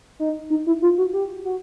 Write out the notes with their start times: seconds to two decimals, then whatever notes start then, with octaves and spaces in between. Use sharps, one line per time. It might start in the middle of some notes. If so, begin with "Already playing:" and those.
0.20 D#4
0.50 D#4
0.67 E4
0.82 F4
0.98 F#4
1.13 G4
1.45 F#4